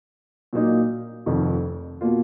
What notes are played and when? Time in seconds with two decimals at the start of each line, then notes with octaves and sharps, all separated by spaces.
0.53 A#2 F#3 A#3 D#4
1.26 F1 F2 D#3
2.01 B2 A#3 F4